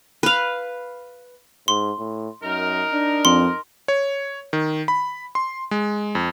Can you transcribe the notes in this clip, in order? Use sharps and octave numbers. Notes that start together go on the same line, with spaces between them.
B4 F5
G#2 C6
A2
F#2 D#4 A#4
D4
F2 C6
C#5
D#3
B5
C6
G#3
F2